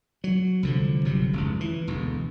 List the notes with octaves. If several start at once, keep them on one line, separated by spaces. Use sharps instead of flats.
F#3
C2 D3 F3
G1 C3 F#3
F1 C#2
E3
E1 D2